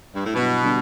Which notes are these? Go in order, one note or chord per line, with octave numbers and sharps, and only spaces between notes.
G2
A2
G2 B2 F#3 B3 E4
D3 G3 B3 D4